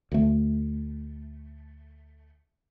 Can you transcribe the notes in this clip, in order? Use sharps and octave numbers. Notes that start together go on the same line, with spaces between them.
D2 A3